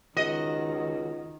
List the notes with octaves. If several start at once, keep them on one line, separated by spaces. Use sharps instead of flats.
C#2 D#3 F#4 D#5